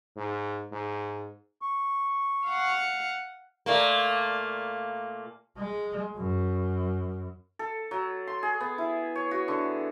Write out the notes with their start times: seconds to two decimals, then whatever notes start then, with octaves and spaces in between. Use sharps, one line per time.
0.17 G#2
0.72 G#2
1.62 C#6
2.46 F5 F#5
3.66 A#2 A3 A#3
5.58 G#3
6.17 F#2
7.59 A4
7.91 F#3
8.27 C6
8.43 G#4
8.60 B3
8.78 E4
9.16 C#5
9.31 F#4
9.48 D3